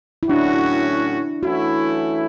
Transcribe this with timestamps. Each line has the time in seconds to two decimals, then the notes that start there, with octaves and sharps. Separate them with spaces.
0.23 E4
0.29 A2 F#3 C#4 D4 F#4
1.43 E3 A3 C#4 E4 F#4